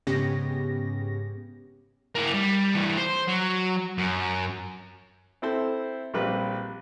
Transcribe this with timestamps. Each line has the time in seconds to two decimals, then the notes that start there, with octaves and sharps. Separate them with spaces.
0.07 G#2 C#3 B3 C#4 G4 A#6
2.15 A#3 E4
2.34 G3
2.75 E3 G3
2.98 C5
3.28 F#3
3.98 F#2
5.42 C4 E4 A4 C5
6.14 A#1 G3 C4 B4